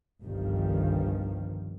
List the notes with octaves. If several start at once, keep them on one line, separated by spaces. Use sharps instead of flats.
G1 C2 G2 D#3 F3 G3